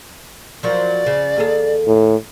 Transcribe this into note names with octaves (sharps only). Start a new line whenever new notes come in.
F3 F#3 A#3 D5
C#3
D#2 G#4 A4
A2